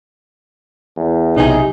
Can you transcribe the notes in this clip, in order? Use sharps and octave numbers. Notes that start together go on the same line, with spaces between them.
E2
B1 C3 D#4 G#4